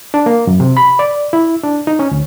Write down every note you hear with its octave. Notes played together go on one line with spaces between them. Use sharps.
D4
A#3
F#2
C3
B5
D5
E4
D4
D#4
C#4
D2